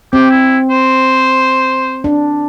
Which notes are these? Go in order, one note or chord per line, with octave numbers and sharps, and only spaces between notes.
C4 G4
E4
C5
D4